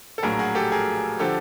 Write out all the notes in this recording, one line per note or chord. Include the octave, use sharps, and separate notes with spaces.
A4
A#1 A2 F#3 G#4 A#4
F#4 G#4
G4 A4
G#4 A#4
D3 F3 G4 A4